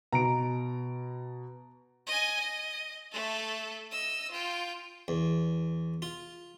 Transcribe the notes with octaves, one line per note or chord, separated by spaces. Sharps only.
B2 A#5 D7
D#5 G#5
D#5
A3 A4
D#5 E6
F4 G5
E2
F4